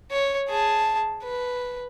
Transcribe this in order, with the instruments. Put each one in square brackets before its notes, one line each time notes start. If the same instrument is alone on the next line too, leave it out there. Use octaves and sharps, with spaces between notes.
[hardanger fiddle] C#5
G#4 A5
B4